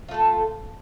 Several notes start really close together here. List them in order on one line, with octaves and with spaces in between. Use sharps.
F4 A3 A4